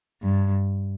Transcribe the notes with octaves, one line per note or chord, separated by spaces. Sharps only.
G2